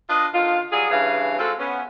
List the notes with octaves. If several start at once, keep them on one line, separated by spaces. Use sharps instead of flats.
D4 F4 B4 D#5
D3 D#3 F4
F#3 G3 F4 G#4
G2 C#3 E3 F5
G#3 C4 F4 F#4 A4
B3 C#4